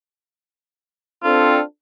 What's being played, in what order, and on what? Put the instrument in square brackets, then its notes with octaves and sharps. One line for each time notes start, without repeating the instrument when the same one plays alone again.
[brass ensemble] C4 D4 A4 [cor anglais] F4